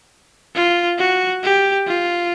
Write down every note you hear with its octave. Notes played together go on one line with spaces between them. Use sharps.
F4
F#4
G4
F4